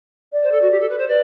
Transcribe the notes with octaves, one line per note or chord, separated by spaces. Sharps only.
D5
C5
A4
F#4
G4
A4
B4
C5
B4 D5